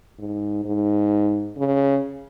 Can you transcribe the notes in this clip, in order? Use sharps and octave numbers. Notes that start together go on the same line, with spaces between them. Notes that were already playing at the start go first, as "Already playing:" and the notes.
G#2
G#2
C#3